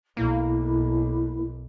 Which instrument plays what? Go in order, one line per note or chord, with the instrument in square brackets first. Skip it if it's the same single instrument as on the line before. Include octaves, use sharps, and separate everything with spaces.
[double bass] B1 [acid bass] A#3 [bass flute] E4